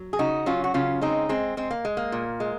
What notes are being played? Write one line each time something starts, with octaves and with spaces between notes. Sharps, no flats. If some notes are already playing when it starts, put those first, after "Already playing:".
Already playing: F#3
G#4
C#3 D#4 F#4
F#3 C#4 F4
F#4
C#3 C#4 F4
G#3 C4 D#4
G#3 C4
G#3 C4
A#3
G#3
A#3
A#2
G#3